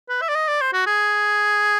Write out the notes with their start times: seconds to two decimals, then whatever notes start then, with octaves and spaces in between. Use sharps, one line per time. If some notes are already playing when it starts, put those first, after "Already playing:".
0.09 B4
0.21 E5
0.29 D5
0.35 D#5
0.48 D5
0.61 C5
0.73 F#4
0.86 G#4